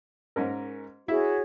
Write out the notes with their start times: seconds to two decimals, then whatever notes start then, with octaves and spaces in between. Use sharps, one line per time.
0.36 G#2 C#4 A#4
1.08 E4 F#4 G#4 C#5 E5